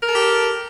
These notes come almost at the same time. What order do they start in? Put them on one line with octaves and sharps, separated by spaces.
A#4 A4 G4